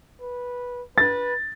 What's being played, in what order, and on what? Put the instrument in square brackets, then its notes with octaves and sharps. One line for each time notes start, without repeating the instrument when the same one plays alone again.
[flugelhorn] B4
[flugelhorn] B4 [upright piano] A6